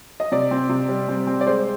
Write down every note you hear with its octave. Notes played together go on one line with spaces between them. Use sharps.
D#5
C3 D5
C4
C3
G3
C4
C4
D5
G#3 C5